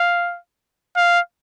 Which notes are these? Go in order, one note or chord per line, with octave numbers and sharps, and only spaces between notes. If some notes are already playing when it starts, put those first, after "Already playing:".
Already playing: F5
F5